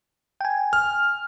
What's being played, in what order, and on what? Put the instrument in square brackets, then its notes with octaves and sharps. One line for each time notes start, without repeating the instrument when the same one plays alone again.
[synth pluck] G5 G#5
[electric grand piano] F6